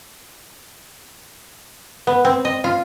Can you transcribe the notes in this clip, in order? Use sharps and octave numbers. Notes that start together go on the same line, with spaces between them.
B3
C4
D#5
F4